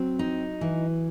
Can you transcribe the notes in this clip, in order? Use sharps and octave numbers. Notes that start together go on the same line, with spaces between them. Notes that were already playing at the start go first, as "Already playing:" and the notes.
Already playing: F#3 C4
D#4
E3